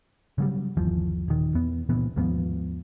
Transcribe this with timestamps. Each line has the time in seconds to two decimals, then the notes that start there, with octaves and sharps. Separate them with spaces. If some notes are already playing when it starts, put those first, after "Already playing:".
0.38 C#3 F#3 G3
0.77 G1 D#2 E3 F3
1.28 D#1 D#3
1.55 E2 B3
1.89 C#2 A#2 E3 B3
2.16 D#2 G#2 F3 B3